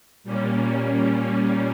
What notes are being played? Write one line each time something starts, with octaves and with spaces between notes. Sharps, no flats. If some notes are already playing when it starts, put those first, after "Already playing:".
A#2 G3 A#3 C#4